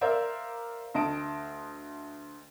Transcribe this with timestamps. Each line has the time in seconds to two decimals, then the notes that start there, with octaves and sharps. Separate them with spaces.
0.01 A#4 C5 D5 E5 F5 A#5
0.94 D2 D#5 A5 D7